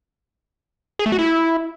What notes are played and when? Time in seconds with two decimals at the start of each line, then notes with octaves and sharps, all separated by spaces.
0.99 G#4
1.06 A3
1.12 F#4
1.19 E4